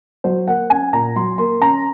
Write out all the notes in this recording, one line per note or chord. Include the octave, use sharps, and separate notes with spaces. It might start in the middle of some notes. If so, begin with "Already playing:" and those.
F#3 C5
A#3 F#5
C#4 G#5
A#2 A#5
F#3 C6
A#3 C6
C#4 A#5